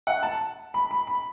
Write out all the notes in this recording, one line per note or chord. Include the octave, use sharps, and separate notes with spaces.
F#5
A5
B5
B5
B5